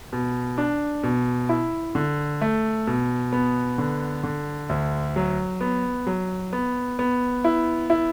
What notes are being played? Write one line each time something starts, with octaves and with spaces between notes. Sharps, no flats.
B2
D4
B2
E4
D3
A3
B2
B3
D3
D3
D2
F#3
B3
F#3
B3
B3
E4
E4